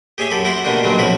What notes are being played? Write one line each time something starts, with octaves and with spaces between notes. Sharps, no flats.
G4 G#4 C#5 E5 G#5
F#2 G4 A4 B5 D6
E4 F#4 G4 F#5 G5 C6
B2 D3 A3 A#3 D4 G4
G2 A#2 C#3 F#3 G#3 A3
B1 C#3 F3 E4 F#4 B5